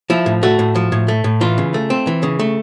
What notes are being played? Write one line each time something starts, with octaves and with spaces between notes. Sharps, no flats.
F3 E4
A2
A3 F#4
A2
F3
A2
A3
A2
E3 F4
C#3
A3
C4
E3
C#3
A3